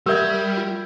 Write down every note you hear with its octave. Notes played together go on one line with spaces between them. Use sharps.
G3 G4 A#4 E5 E6 G6 G#6
F4